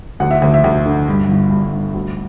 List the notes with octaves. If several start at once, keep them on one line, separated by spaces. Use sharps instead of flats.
D2 F#5
E5
D2
E5
D2
D3
G2
G1
G2
G2
D2